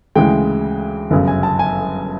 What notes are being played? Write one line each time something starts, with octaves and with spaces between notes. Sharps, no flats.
D2 C#3 E3 G#3 G5
G1 F#2 C#3
G#5
A5
G#5